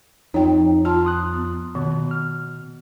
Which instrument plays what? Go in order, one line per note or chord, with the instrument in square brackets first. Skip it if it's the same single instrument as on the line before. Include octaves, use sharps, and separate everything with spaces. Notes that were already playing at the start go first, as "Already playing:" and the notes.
[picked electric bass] F2 [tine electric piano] D#4 F4 [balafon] C#5 G5
[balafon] F4 A5 [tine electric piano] C6 F6
[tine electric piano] C6 D#6 F#6
[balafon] B3
[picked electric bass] B2 [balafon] D#3
[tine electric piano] F6